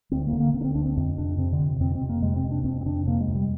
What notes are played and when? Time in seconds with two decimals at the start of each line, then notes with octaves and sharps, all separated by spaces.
0.12 D2 C4
0.27 A#3
0.33 D3
0.40 A#3
0.54 D3 C4
0.61 D4
0.64 C4
0.75 D2 D4
0.86 C4
0.96 F2 C4
1.18 C3 D4
1.38 C3 C4
1.53 D3
1.59 F2
1.80 F2 C4
1.95 C4
2.01 C3
2.09 A#3
2.22 C3 G#3
2.36 C4
2.43 F2
2.51 D4
2.64 F2 C4
2.81 C4
2.86 C3 D4
3.07 C3 A#3
3.21 G#3
3.28 F2
3.35 G3